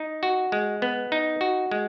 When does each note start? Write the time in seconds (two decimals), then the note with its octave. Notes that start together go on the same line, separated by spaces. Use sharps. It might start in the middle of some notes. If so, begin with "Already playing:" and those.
Already playing: D#4
0.23 F#4
0.52 G#3
0.82 B3
1.12 D#4
1.41 F#4
1.71 G#3